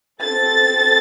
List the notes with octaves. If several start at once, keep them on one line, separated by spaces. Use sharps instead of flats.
C4 A4 A6